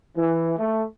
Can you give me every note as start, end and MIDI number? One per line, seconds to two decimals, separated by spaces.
0.17 0.52 52
0.59 0.84 57